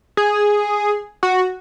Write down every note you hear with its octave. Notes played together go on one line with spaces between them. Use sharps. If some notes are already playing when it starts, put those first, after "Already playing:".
G#4
F#4